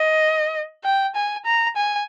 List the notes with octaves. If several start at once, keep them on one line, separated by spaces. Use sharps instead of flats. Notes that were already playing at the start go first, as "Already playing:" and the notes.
Already playing: D#5
G5
G#5
A#5
G#5